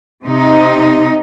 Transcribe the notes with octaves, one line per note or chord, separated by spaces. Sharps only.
C3 D#4